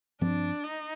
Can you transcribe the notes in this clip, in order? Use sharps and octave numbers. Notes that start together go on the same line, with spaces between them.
G2 F3 C4 D4
D#4